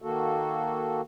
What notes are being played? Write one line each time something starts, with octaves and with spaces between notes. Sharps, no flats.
D#3 A#3 F#4 A4